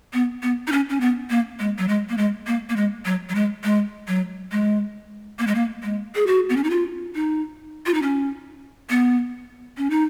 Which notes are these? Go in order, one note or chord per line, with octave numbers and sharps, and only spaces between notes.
B3
B3
D#4
C#4
C#4
B3
A#3
G#3
F#3
G#3
A#3
G#3
A#3
A#3
G#3
F#3
F#3
G#3
G#3
F#3
G#3
A#3
G#3
A#3
G#3
G#4
F#4
B3
C#4
D#4
F4
D#4
F4
D#4
C#4
B3
C#4
D#4